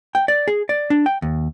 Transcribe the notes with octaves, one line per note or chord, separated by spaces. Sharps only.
G5
D5
G#4
D5
D4
G5
D#2